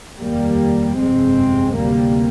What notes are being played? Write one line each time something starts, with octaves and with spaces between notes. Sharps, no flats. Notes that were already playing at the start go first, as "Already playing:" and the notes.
F1 D#2 G3 A#3
G1 F2 C3 G#3 C4
D2 C3 G3 A#3